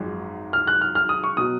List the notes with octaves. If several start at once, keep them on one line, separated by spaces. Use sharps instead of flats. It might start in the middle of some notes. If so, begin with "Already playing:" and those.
Already playing: G#1 F#2 F3 G#3
F6
F#6
F6
F6
D#6
C#6
B2 F#3 D#6